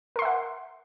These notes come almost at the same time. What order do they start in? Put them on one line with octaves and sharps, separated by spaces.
A#4 C6 E5 F#5